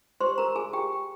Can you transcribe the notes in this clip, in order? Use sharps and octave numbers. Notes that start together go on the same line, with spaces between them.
G4 C5 C6
A#4 A#5
G#4 G#5
G4 G5